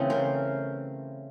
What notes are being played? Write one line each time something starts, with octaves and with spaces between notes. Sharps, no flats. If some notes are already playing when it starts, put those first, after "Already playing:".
Already playing: C#3 E3 A3 C4
A#4 C5